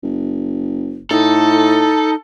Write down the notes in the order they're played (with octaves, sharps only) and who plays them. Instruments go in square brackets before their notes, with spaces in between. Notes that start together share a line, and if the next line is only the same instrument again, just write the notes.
[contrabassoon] F#1
[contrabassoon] A2 [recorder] D#4 [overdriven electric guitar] A4